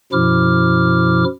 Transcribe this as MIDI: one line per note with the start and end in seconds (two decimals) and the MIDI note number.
0.12 1.24 42
0.12 1.24 47
0.12 1.24 53
0.12 1.24 64
0.12 1.24 86
0.12 1.24 89